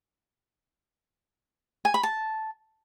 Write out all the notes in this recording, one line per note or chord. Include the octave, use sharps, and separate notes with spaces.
G#5
B5
A5